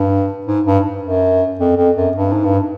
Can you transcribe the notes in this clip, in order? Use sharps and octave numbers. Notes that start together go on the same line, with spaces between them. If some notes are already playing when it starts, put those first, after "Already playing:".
Already playing: G2
G#2
G2
F#2
F2
F2
F#2
G2
G#2
G2